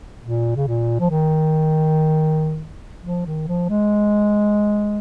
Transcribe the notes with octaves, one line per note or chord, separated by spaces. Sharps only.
A#2
C#3
A#2
F3
D#3
F3
D#3
F3
G#3